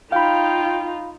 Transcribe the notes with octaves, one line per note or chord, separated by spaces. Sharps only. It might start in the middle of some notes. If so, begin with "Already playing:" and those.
D#4 F4 F5 G5 B5